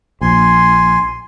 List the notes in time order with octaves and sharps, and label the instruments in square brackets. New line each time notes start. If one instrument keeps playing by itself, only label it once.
[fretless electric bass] A#1 [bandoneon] G#5 C6